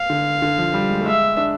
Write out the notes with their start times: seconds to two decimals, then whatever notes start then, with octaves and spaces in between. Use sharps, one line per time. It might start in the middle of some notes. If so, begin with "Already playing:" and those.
Already playing: F5
0.10 D3
0.42 D3
0.58 F3
0.74 G3
0.89 G#3
1.01 A3
1.05 G#3 E5
1.37 D4